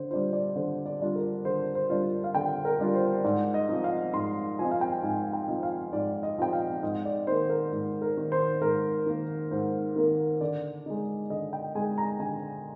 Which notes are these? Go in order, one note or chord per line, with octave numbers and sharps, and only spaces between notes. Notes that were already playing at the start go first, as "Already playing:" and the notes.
Already playing: D3 C5
G3 D4 F4 C5
D5
D3 C5
D5
G3 D4 F4
A#4
D3 C5
C5
G3 D4 F4
F5
D3 G5
A#4
G3 D4 F4
C5
G#2 D5
D#5
F3 C4 D#4
F5
G#2 C6
F3 C4 D#4 G#5
F5
G5
G#2 G#5
G5
F3 C4 D#4
F5
G#2 D5
D#5
F3 C4 D#4 G5
F5
G#2 D#5
D5
D#3 A#3 C5
A#4
G#2
A#4
D#3 A#3
C5
G#2 A#4
D#3 A#3
G#2 C5
D#3 A#3
D3 D5
G#3 D#4
D3 D#5
G5
G#3 D#4 G#5
A#5
D3 G#5